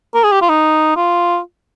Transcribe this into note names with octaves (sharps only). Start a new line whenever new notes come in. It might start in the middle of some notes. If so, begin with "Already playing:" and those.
A#4
G#4
G4
F4
D#4
F4